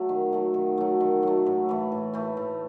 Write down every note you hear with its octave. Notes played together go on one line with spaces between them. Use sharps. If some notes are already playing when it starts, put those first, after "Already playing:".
Already playing: F#3 A3
D#3
F#3 A3
D#3
F#3 A3
D#3
F#3 A3
A2
E3 A3
A2
E3 A3
A2